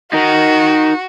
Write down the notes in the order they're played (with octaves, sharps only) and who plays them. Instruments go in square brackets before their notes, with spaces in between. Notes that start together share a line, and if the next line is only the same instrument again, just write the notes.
[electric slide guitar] D#4 A#4 [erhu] F#4